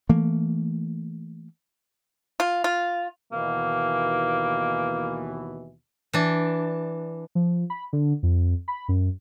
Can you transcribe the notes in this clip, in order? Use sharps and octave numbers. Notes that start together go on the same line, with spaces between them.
E3 A3 A#3
F4
F4
D#2 B2 E3 A#3
E3 D4
F3
B5
D3
F2
B5
F#2